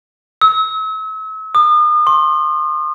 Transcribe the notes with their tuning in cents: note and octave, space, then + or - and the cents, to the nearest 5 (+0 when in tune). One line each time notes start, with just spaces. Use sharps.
E6 -40
D#6 -40
C6 +30